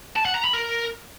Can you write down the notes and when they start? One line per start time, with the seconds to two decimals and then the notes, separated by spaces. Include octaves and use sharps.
0.16 A5
0.25 F#5
0.35 A#5
0.44 B5
0.53 A#4